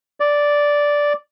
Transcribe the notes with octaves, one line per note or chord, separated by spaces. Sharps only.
D5